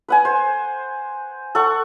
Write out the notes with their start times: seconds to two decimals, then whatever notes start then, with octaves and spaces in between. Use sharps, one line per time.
0.08 B4 F#5 G#5
0.25 C5
1.55 A4 F#5 C#6